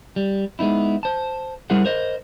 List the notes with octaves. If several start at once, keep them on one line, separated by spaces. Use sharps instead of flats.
G3
G#3 B3 D#4 E4
C5 A5
G3 E4 G#4 A#4 C5 F#5
A#4 C5 D#5